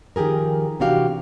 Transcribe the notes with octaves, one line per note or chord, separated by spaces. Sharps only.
D#3 F3 G4 G#4 A#4
C3 E3 D4 F#4 G4 F5